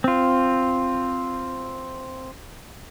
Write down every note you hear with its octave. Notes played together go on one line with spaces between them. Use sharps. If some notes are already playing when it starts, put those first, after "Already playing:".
C4 F4